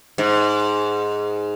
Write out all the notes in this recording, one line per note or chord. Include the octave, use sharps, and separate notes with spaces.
G#2